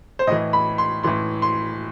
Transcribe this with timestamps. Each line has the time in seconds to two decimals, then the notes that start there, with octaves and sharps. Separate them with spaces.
0.19 C5
0.27 A2 E3 D#5
0.53 B5
0.78 C6
1.03 A2 E3 C6
1.42 C6